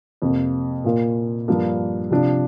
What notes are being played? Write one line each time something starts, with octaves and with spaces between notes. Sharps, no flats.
F2 C3 A#3
A#2 A#3 F4 A#4
G2 F3 A#3 D4
C3 F3 D4